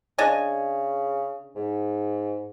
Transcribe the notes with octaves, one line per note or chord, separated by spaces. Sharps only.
C#3 D4 D#5 G#5
G#2